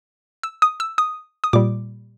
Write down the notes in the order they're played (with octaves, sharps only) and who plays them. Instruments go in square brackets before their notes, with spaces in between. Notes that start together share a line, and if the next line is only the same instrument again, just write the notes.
[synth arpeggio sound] E6
D#6
E6
D#6
D#6
A#2 G3 D6